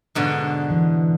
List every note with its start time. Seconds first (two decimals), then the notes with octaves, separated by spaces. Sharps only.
0.15 G#2 B2 D3
0.70 E3